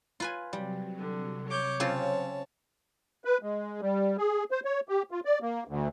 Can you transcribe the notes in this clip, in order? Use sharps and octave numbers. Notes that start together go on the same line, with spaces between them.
F4 B4 G#5
C3 F#3 G3
D3
C#5 D6 G6
C#3 C4 F4 C#5 A5
B4
G#3
G3
G#4
C5
C#5
G4
F4
D5
A#3
D2